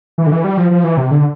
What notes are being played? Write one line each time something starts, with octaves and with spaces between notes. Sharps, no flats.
E3
D3
E3
G3
F3
F3
E3
C3
D3